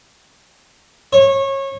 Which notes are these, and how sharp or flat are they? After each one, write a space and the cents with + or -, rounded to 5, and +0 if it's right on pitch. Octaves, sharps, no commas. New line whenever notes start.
C#5 -25